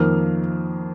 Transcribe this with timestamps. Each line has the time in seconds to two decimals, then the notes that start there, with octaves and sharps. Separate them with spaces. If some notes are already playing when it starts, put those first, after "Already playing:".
Already playing: F2 D#3 A#3 F6